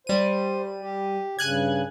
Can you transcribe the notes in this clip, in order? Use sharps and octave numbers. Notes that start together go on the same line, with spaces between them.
G3 C5 D#7
G4
G2 C#3 G#5 F#6 G#6